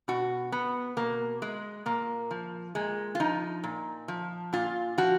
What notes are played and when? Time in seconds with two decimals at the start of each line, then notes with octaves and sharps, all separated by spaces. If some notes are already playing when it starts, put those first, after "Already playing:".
0.08 B2 F#4
0.52 B3
0.97 B2 A#3
1.42 G#3
1.86 A#2 A#3
2.31 F3
2.75 A#2 G#3
3.15 F4
3.20 F3 D#4
3.63 A#2
4.08 F3
4.53 A#2 F4
4.98 F3 F#4